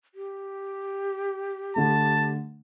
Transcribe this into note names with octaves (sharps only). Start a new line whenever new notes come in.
G4
D3 A3 A5